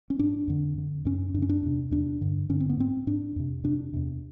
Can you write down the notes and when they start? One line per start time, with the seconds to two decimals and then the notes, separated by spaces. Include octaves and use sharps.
0.10 C#4
0.19 G#2 D4
0.48 F2 D3
0.78 F2 D3
1.05 F#2 C#3 C#4
1.34 F#2 D4
1.38 C#3 C#4
1.49 D4
1.63 E2 C3
1.91 E2 C3 D4
2.21 G2 D3
2.49 G2 D3 C#4
2.60 C4
2.70 B3
2.78 G#2 C4
3.07 G#2 D4
3.36 F2 C3
3.64 F2 C3 D4
3.93 E2 C3